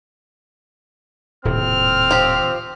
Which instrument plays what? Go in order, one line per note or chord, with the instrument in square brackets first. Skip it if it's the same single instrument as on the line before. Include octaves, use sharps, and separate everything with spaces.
[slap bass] D#1 A2 C3 [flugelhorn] C4 [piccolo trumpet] F6
[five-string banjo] F3 G4